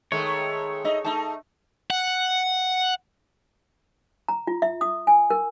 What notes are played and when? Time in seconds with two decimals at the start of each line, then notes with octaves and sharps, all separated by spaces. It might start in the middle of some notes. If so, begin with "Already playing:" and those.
0.12 D#3 G#3 A3 C#5
0.84 D#4 A4 D#5 E5
1.05 A3 D#4 A5
1.91 F#5
4.28 A#5
4.47 F4
4.62 E5
4.81 D#6
5.07 G#5
5.30 A#4